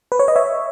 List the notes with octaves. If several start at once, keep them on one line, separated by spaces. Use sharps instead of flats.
B4
C#5
D#5
C#5 E5